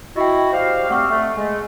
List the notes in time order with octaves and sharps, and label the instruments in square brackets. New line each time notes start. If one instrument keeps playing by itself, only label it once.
[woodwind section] E4 F#4 [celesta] D#5 G5
[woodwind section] G3 C5 F5
[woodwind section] G3 A3 C4 [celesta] F#5 C#6 F6
[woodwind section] A3
G#3 A3